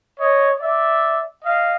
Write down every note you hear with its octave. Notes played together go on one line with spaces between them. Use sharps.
C#5 D#5
D5 E5
D#5 F5